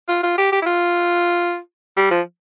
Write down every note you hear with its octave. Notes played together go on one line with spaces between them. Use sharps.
F4
F4
G4
G4
E4
F4
G3
F3